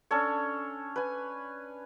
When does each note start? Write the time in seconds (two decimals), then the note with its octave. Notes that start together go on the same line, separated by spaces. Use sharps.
0.11 C#4 D4 A4 C#5
0.96 B4 G#5